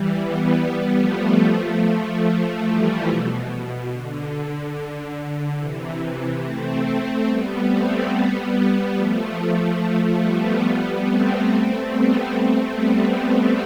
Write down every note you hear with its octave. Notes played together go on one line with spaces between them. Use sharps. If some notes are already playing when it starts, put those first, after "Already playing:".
Already playing: E3 G3
G3 B3
G3 B3
F3 A3
F3 A3
E3 G3
B2
B2
D3
D3
C3 E3
A3 C4
A3 C4
G3 B3
A3 C4
G3 B3
F3 A3
F3 A3
G3 B3
A3 C4
A3 C4
G3 B3
A3 C4
G3 B3